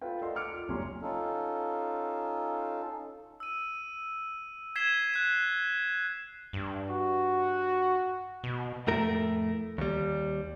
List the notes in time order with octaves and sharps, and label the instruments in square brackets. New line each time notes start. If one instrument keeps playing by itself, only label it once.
[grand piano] F4 A4 B4 F5 G5
A4 A#4 D5 D#5 F#5 C6
D6 F6 C#7 D7
F4
F#1 G3 C#4 A#5 C6
[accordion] C#4 D#4 F4 A4
[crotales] E6 D#7
G#6 B6 C7 D#7 E7 G7
F#6 C7
[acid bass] G2
[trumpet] F#4
[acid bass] B2
[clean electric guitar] F2 A2 A3 A#4
D#2 G3